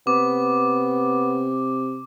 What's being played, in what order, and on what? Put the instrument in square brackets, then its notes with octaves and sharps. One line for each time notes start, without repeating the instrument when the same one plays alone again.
[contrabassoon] C3 [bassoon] B3 [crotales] D6